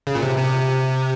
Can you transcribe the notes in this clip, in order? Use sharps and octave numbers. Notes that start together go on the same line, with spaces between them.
C#3
A#2
C3
C3